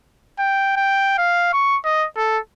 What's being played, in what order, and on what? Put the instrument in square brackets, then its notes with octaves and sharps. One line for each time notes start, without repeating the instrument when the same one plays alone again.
[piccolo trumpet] G5
G5
F5
C#6
D#5
A4